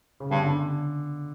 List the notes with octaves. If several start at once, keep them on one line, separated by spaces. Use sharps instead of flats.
C#3
G2 D3
D3